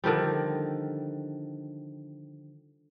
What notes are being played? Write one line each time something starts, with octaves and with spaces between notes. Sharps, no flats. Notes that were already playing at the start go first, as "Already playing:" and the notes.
D3 D#3 F3 G3